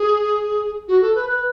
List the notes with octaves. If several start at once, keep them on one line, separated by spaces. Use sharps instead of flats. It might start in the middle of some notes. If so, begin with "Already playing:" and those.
Already playing: G#4
F#4
A4
B4
B4